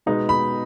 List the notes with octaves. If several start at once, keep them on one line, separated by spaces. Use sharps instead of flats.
B2 G#3 B3 D#4
B5